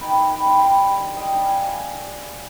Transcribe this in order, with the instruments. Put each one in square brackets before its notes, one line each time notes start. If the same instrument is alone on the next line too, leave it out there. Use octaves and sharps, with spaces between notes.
[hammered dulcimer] D#3 G5 B5
G5 B5
G3 D4 C6
G5 B5
D#3
D#5 G5
G3 D4
F5 G#5